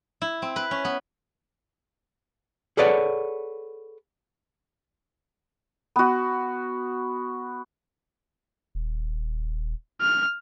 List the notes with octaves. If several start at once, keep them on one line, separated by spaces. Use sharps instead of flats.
E4
C4
B4
C#4
B3
G#4 A4 B4 C#5 D5 F#5
B3 F#4
D#1
F6